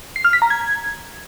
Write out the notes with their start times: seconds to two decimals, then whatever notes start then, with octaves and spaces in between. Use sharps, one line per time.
0.16 C7
0.25 F6
0.33 B6
0.42 A#5
0.50 G#6